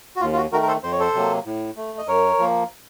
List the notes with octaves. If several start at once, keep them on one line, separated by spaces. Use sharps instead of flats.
F#4
D#2 F4
F4
F#4
D#3 A3 F#4 A#4
A#4
A4 C5
F2 C5
C#5
A4 C5
C3 F#3 A#3
A2
A3
D#5
F#2 A#4 C#5
F3 A#3